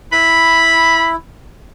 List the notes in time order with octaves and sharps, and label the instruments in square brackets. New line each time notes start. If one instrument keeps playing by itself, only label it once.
[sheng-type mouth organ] E4 [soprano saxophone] B5